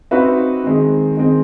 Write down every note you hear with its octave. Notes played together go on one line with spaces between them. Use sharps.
C4 D#4 F#4 B4 E5
D#3 G#3 C4
D#3 G#3 C4